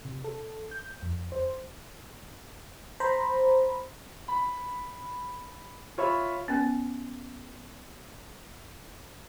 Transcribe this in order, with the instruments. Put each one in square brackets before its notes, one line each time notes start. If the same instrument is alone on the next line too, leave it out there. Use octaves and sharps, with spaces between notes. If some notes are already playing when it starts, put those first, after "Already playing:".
[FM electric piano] C3
A4
G6
F2
C5
C5 A#5 B5
[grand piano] B5
F4 C#5 E5 B5
[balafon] B3 C#4